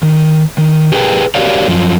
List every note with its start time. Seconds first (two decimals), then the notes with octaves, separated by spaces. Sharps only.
0.03 D#3
0.58 D#3
0.92 G4 G#4 A#4 B4 F#5 G5
1.35 F#4 G4 A#4 C#5 D5 F5
1.68 F#2 F3